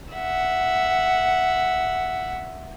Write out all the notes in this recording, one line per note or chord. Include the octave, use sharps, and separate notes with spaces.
E5 F#5